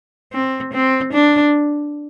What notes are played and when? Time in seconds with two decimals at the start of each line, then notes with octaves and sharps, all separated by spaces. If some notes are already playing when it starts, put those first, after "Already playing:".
0.33 C4
0.73 C4
1.13 D4